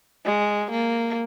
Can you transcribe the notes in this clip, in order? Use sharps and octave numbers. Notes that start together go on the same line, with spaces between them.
G#3
A#3